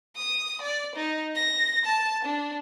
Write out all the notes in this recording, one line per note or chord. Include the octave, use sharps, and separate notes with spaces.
D#6
D5
D#4
A#6
A5
D4